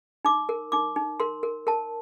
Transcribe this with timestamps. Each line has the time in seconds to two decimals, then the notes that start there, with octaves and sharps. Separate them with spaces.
0.25 D#4 D6
0.49 A#4
0.72 D#4 D6
0.96 D#4
1.20 A#4 C6
1.43 A#4
1.67 A#4 A5